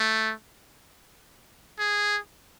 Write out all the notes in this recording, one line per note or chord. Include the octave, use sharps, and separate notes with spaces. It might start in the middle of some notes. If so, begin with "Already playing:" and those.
Already playing: A3
G#4